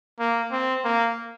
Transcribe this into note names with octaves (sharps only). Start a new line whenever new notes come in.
A#3
C4
A#3